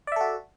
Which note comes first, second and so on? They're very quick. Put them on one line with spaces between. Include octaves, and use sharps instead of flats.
D5 E5 A4 F#4